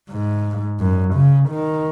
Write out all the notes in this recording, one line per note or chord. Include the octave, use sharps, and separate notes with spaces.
G#2
F#2
C#3
D#3